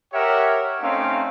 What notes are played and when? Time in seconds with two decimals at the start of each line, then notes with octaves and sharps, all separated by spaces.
0.13 G4 A#4 C#5 E5 F#5
0.81 A3 C4 C#4 D#4 F5